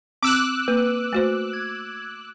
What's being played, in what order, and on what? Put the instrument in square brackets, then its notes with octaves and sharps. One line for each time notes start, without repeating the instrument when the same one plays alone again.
[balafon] C4 [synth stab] D6 E6 F#6
[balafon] A#3 [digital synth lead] B4
[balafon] A3 F#4 C5
[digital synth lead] G#6